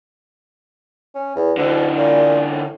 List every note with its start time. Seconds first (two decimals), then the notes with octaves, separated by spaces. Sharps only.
1.15 C#4
1.36 E2
1.57 D2 D3 E3
1.97 A#2
2.50 A2